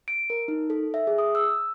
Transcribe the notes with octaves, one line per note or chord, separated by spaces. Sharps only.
D7
A#4
D#4
A4
E5
G#4
D#6
E6